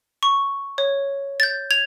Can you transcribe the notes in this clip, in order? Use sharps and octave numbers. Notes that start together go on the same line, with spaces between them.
C#6
C#5
G6 A6
G#6 F7